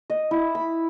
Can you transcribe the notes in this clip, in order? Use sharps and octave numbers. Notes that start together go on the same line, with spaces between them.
D#5
E4
B5